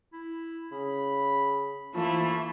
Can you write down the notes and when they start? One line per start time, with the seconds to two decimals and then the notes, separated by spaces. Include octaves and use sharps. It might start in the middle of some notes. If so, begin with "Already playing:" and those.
0.13 E4
0.72 C#3 B5
1.95 E3 F3 A3 A#3 E4